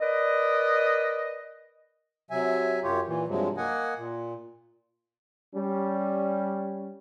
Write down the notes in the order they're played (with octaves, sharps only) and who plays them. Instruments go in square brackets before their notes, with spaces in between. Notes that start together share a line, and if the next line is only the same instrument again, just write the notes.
[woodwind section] A#4 B4 D5 D#5
[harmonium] C3 F#3 E5 G#5
F#2 F4 G4 C#5
A#2 E3
G2 C3 F3 F#3 G#3
A#3 D#5 F#5 G#5
A#2
[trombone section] G3 C#4